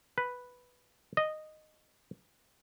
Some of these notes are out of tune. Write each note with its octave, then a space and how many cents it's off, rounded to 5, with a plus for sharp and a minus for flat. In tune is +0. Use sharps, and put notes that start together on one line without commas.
B4 +0
D#5 -10